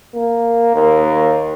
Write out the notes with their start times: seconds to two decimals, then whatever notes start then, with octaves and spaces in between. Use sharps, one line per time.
0.15 A#3
0.75 D#2